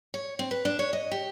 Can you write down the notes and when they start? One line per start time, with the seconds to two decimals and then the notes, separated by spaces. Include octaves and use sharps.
0.14 C#5
0.39 C4
0.51 B4
0.65 D4
0.79 C#5
0.93 D#5
1.12 G4